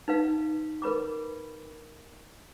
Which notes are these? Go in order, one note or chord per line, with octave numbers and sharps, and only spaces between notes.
D#4 B4 F5
A#4 B4 B5 D6